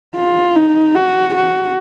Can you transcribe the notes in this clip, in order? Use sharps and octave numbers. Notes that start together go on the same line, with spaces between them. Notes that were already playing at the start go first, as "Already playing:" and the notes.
F4
D#4
F#4
F#4